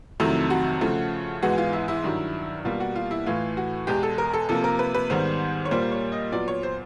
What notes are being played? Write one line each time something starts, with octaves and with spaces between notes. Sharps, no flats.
F2 C3 D#3 F#3 A3 E4
F#4
C#3 F3 A3
G#2 E3 G#3 B3 F#4
F4
E4
E4
G2 D#3 F#3
B2 G3 A#3 F4
F#4
F4
E4
A2 E3 A3 F4
F#4
E2 B2 G#3 G4
A4
A#4
A4
C3 F3 A#3 A4
A#4
B4
B4
G#2 D#3 G3 B3 C5
C#5
A#2 G3 A#3 C5
C#5
D#5
A#2 F#3 B3 D5
C#5
C5